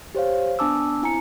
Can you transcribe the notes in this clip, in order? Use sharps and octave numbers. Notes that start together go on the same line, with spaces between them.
G4 C5 C#5 F5
B3 D4 G#5 A5 D6 E6
C4 E4 G#5 A#5 C#7